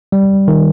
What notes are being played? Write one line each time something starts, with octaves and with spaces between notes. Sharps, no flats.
G3
D#3